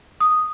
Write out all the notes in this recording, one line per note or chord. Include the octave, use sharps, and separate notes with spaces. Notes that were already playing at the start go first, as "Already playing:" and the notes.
D#6